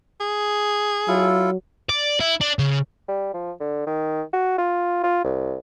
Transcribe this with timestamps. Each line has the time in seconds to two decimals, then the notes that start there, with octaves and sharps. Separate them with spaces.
0.20 G#4
1.08 F#3 E4 F4 A4
1.89 D5
2.20 E4
2.41 D4
2.59 C#3
3.09 G3
3.34 F3
3.60 D3
3.87 D#3
4.33 F#4
4.58 F4
5.04 F4
5.25 C2